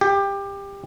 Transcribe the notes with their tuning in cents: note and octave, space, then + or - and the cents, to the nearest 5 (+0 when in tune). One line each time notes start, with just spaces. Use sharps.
G4 +20